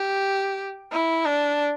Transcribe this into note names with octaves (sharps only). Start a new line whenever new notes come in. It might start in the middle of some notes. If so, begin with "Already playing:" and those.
Already playing: G4
E4
D4